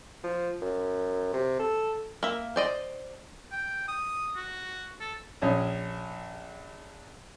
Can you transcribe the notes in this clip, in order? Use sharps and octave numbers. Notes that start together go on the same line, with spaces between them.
F3
F#2
C3
A4
A#3 E5
C5 D5 D#5
G5
D#6
F#4
A4
A#1 C#4 D#6